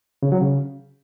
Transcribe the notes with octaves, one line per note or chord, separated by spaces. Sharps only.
C#3
F#3
C#3